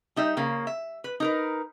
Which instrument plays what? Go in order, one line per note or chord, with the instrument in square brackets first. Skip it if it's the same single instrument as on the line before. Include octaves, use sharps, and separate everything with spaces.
[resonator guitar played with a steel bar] G3 D#4 E5
C#3 A#3
E5
B4
D#4 A#4 B4